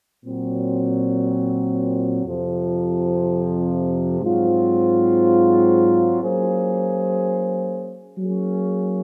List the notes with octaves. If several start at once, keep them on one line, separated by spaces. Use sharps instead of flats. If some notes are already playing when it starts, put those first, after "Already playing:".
A#2 F#3 C4
F2 C3 F3
G#2 F#3 C4 F4
F#3 A#3 C#4 G#4 C5
F#3 A#3 C#4 G#4